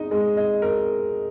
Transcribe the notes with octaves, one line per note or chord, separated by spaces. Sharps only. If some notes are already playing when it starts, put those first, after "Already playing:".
Already playing: G#3 D#4 D#5
G#3
D#5
A#4